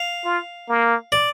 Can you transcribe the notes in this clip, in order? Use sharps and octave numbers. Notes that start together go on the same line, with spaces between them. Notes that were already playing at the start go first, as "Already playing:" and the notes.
Already playing: F5
F4
A#3
D5